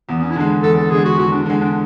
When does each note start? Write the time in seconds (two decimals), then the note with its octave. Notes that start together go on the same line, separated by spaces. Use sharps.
0.09 E2 B3
0.19 B3
0.23 C#4
0.30 E4
0.36 D3 G#3 D4
0.63 E2 A4
0.78 A4
0.91 D3 G#3 G#4
1.05 F#4
1.18 E2 F#4
1.32 D4
1.46 D3 G#3
1.60 D4